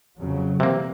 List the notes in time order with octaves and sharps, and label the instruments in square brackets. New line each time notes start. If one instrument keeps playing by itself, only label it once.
[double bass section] F2 C#3 F#3
[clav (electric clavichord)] C3 A#3 [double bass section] E3 G3 C4